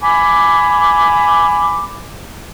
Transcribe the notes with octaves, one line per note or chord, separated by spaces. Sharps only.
G#5 B5 D6